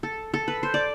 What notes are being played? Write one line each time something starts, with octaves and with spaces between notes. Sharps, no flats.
A4
A4
B4
C5
D5